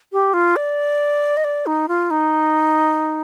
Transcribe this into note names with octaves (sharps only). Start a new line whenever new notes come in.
G4
F4
D5
D#5
D5
D#4
F4
D#4